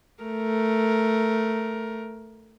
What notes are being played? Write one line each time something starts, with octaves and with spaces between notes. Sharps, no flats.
A3 A#4